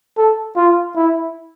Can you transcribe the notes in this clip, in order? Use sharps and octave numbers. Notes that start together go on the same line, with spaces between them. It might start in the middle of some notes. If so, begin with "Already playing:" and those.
A4
F4
E4